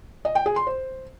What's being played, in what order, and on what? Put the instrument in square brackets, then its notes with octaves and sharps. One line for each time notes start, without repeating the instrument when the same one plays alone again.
[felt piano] D#5
G5
G#4
C6
C5